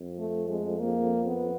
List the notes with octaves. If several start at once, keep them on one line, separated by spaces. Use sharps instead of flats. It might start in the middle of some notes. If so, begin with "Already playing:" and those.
Already playing: F2
A3
G#3
A#3
B3